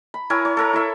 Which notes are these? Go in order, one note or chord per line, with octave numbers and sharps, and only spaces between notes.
B5
E4 A#4 C#5 G#5
C#5
A4 A#4 A#5
E4 A4 E5